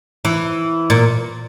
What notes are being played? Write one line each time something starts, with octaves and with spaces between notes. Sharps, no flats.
E3
A#2